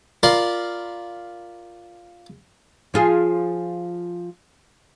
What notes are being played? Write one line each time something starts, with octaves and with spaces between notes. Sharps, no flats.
F4 A#4 D5 B5 C6
F3 F4 G#4